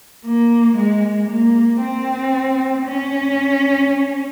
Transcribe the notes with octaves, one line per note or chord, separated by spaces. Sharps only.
A#3
G#3
A#3
C4
C#4